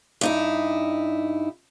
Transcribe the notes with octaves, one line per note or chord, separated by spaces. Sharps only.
G2 D#4 E4